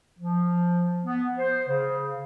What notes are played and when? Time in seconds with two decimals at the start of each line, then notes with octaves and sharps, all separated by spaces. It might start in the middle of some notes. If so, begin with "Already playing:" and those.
0.19 F3
1.05 B3
1.38 C5
1.69 C#3